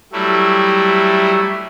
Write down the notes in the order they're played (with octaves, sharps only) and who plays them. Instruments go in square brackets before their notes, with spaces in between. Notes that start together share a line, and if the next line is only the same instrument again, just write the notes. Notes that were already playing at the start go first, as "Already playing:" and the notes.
[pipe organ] F#3 G3 A3 E4